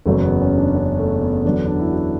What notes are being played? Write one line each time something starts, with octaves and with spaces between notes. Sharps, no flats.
F#1 E2 C#3 F#3 A3
B3
C#4
D4
C#4
A3
B3
E2 D3 F#3 D4
D4
E4
F#4